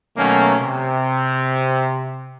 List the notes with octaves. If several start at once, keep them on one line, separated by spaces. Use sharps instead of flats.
B2 D#3 F#3 A3 A#3 C#4
C3